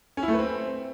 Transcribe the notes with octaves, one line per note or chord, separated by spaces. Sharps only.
C#4
E4
A3
B4
C4